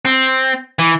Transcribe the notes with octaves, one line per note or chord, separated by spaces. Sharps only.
C4
E3